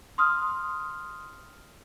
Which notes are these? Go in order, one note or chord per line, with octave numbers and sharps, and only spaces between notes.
C6 D#6 F6